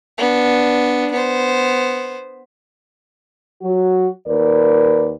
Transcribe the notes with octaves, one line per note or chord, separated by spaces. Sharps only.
B3 D4
B3 C5
F#3 F#4
D#2 A#4 B4 D5